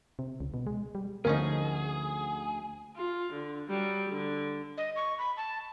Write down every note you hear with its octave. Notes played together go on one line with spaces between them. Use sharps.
C3
C#2
B2
G#3
G3
D2 F3 C#4 D#4 G#4 A#4
F4
D3
F#3 G3
D3
D#5
C#6
B5
A5